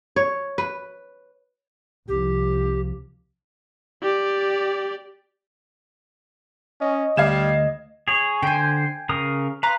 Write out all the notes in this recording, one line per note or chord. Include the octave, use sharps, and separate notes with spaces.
C#5
B4
C2 F3 G4
G4 D5
C#4 D#5
D2 G3 F5 G#6 E7
G#4 C#5
D3 C5 G5 G#5
C#3 A#4 D#6
B4 F5 A#5 C6